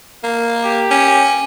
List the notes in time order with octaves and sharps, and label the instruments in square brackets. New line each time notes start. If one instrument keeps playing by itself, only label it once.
[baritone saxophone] A#3
[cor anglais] G4
[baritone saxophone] C#4